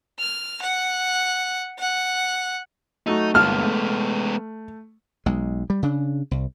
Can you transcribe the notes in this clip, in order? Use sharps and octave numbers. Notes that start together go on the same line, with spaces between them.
F6
F#5
F#5
F#3 A3 D#4 F#4
G1 G#3 A#3 B3 A5 F6
A3
B1 G#3
G3
C#3 D4
C2